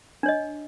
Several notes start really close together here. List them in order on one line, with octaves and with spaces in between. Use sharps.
D4 C#5 D#5